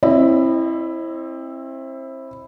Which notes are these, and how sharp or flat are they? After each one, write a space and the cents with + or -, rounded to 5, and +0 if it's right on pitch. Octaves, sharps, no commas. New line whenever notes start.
C4 +30 E4 +0 D#5 -30